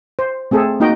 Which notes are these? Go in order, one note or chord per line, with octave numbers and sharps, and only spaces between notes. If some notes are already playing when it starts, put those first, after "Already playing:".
C5
A3 C4 G#4 A4
A#3 D#4 F#4 D#5 G5